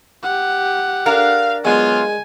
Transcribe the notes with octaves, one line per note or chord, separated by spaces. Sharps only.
G4 F#5
D4 A#4 F5
F#3 G#3 B3 F4 G#5